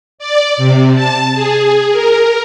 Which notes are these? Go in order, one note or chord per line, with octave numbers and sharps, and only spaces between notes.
D5
C3
A5
G#4
A#4